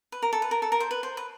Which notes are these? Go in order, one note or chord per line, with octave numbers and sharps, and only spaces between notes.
B4
A#4
A4
B4
A#4
A4
A#4
C5
B4
C5
B4